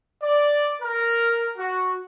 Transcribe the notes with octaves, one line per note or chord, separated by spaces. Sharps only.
D5
A#4
F#4